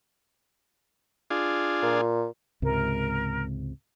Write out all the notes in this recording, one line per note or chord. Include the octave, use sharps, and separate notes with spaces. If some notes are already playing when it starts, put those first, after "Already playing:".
D4 F4 G#4
A#2
C#2 G#2 C3 A#4